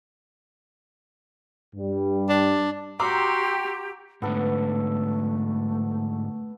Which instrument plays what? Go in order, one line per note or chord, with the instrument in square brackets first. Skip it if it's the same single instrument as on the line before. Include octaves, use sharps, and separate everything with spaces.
[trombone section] G2 G3
[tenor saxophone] D4
[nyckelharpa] F#4 C6 [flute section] G4 [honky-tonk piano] A#5 D6 E6
[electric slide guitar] G#2 D3 [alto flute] A3 [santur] B3 A4